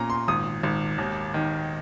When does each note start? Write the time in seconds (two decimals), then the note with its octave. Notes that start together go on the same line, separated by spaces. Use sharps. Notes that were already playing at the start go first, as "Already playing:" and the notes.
Already playing: A#2 C#4 A#5
0.10 C6
0.28 G#1 D#6
0.63 G#1
0.98 D#2
1.34 D#3